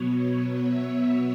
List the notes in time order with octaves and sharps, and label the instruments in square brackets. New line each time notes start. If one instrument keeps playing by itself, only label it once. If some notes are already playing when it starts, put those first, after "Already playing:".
Already playing: [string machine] B2 F#3 B3 C#5
E5